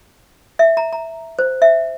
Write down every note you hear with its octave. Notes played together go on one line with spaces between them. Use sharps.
E5
A#5
A#5
C5
E5